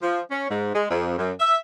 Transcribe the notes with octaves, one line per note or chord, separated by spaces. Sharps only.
F3
C#4
G#2
G#3
F2
F#2
E5